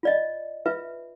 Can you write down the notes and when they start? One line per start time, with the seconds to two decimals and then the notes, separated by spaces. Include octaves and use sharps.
0.03 F4 D5 D#5
0.66 F4 B4 E5